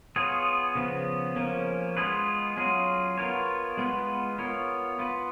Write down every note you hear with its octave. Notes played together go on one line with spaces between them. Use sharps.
B3 F4 G#4 C#5
C#3 F3 B3
F3 A#3 C#4
G#3 B3 F4 G#4 B4
F#3 C#4 F4 G#4
B3 F4 A#4 C#5
G#3 B3 F4 B4
B3 F4 A#4 C#5
B3 F4 B4